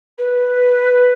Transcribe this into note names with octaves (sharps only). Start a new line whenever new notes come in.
B4